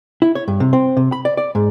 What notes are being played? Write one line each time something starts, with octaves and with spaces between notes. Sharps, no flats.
E4
C#5
G2
C3
C4
C3
B5
D5
D5
G#2